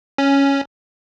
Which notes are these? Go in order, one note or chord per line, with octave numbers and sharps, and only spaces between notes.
C#4